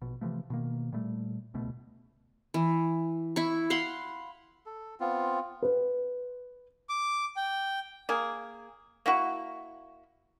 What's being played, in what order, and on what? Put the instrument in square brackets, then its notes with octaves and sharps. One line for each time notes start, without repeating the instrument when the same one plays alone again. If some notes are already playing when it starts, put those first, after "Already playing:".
[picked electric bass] A#1 B2
C3 E3 F3 A3
B2 D#3 A#3
A#2 G3 A3
D1 C#2 B2 A3
[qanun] E3
E4 C#6
F5 F#5 B5 C6
[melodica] A4
B3 C4 F4
[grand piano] B4
[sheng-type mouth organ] D6
G5
[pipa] A#3 G#4
A#3 E4 F#4